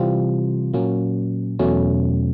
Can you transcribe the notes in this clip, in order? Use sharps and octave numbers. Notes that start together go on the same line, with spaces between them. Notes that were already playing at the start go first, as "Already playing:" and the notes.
Already playing: C3 E3 G3 C4 F4
A#2 F#3 A#3 C#4
E2 B2 F#3 A3 C#4